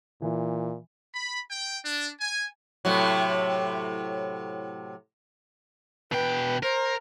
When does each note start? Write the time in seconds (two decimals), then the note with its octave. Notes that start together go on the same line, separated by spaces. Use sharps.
0.22 A#2 E3
1.13 B5
1.50 G5
1.85 D4
2.20 G#5
2.85 A2 C3 F#3
6.12 B2 B4 G5
6.63 A#4 C5